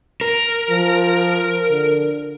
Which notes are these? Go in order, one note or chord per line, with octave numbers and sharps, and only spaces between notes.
A#4
F3
D3